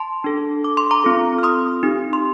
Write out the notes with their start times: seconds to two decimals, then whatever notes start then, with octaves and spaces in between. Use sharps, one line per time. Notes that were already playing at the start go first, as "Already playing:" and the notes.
Already playing: A5 C6
0.24 D4 A4
0.64 D6
0.77 C6
0.91 A#5 D6
1.04 C4 F4 A4
1.38 F6
1.43 C6 D#6
1.83 C4 D#4 G4
2.13 C6